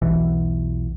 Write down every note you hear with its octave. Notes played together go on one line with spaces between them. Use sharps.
B1 E2 B2 E3